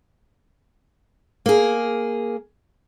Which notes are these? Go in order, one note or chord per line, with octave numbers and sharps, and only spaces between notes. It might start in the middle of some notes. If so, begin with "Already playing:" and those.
A#3 G#4